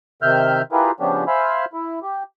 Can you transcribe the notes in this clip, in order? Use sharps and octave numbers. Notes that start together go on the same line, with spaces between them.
C3 D#3 E5 F6 G6
E4 F4 G4 G#4 A#4 B4
C#3 F3 B3 C#4 D4 G4
C5 E5 F5 G#5 B5
E4
G4